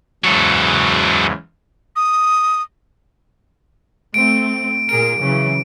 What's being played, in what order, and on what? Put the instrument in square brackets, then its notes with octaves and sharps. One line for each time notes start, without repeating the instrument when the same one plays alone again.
[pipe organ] E2 G#2 C#3 [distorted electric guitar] F#3 A4
[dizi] D#6
[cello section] A3 C4 [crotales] D7
[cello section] A#2 G#4 A#4 [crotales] D7
[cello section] C#3 E3 F#3